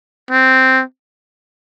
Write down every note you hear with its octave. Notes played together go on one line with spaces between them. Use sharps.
C4